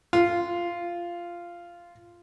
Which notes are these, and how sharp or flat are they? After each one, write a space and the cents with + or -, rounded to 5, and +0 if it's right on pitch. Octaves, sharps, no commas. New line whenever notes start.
F4 -10